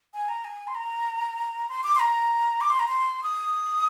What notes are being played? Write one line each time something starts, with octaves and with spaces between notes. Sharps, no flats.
G#5
A#5
G#5
C6
A#5
C6
D6
C6
A#5
D6
C6
A#5
C6
D#6